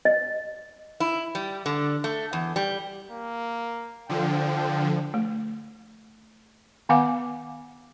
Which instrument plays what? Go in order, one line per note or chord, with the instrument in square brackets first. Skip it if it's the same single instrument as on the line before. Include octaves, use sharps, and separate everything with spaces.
[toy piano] D#5
[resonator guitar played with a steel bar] E4
G3
D3
A3
E2
G3
[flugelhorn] A#3
[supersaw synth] D3 F3 [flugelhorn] G5
[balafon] A3
D#3 B3 F5 F#5 G#5 D6